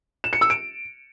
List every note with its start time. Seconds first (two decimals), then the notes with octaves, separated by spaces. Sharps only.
0.24 E7
0.33 C#7
0.41 E6
0.50 D7